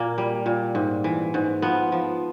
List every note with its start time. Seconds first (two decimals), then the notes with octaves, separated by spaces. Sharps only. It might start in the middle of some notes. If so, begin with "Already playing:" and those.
Already playing: A#2 A#3
0.18 G3
0.46 A#2
0.75 G#2
1.04 E3
1.34 G#2
1.62 F3 B3
1.92 F3